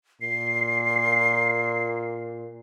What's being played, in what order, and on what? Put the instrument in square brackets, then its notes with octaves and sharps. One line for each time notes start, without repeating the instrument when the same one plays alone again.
[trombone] A#2 [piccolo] C7